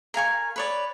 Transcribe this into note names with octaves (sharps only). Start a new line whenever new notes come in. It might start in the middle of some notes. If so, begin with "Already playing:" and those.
A#4 F5 G#5 C#6
B4 C#5 D5